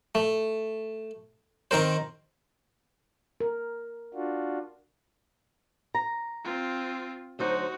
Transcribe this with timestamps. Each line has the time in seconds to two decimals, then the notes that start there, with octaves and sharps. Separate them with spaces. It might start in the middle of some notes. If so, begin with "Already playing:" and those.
0.15 A3
1.71 D#3 C4 A#4 C5
3.40 A#4
4.14 D4 F4 F#4
5.95 A#5
6.44 C4 F4
7.39 D2 F#3 D#4 F#4 C5